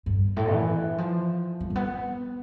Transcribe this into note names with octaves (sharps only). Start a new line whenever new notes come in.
G2
A2
E3
F3
G3
A3
B3